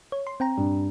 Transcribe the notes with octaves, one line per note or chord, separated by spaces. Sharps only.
C#5
C6
C4 G5 A#5
G2